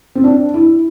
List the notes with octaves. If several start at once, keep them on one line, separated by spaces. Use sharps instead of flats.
C4
D4
E4